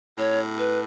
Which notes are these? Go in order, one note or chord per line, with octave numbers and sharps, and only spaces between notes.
A2 C#5
B4